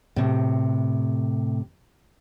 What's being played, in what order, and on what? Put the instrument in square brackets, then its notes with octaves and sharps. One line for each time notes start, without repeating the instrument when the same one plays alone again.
[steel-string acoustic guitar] A2 C3